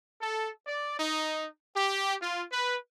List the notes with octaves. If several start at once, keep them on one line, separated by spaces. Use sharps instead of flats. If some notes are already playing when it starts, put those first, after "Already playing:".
A4
D5
D#4
G4
F4
B4